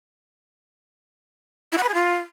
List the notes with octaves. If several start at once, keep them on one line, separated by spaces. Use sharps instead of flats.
E4
F#5
B4
G#4
F4